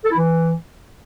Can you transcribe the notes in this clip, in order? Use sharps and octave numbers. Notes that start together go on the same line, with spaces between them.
A4
E4
E3